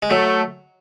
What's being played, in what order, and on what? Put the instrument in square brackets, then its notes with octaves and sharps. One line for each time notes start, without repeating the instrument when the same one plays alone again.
[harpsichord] G#3
[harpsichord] F#3 [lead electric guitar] A3